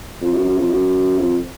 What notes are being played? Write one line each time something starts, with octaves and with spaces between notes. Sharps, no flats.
F2
F#2
F#2
F2
F#2
F2